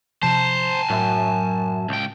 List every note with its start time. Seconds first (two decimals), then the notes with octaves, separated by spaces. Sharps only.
0.23 C3 F3 C5 G#5 A5
0.90 F#2 A2 E5
1.89 C#2 G5